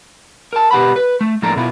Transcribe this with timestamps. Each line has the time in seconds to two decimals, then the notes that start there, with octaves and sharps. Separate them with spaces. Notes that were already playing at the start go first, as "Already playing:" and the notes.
0.53 A#4 A5
0.71 B2 G4 B4 F#5 B5
0.96 B4
1.21 A3
1.42 A2 F3 A#3 D4 A4 A#5
1.56 B2 E4 F4